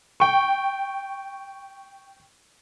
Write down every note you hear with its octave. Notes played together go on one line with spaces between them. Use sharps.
G5 C#6